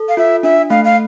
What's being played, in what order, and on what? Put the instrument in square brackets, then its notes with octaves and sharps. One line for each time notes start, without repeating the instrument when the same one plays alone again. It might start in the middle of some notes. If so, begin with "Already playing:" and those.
Already playing: [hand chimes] A4
[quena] F5
[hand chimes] F4 [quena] E5
[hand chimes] D4 [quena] E5
[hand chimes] A3 [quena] F5
[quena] F5